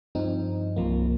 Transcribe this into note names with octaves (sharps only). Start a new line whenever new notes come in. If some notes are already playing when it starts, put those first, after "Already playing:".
G2 F3 C4 D#4
C2 C3 F3 A#3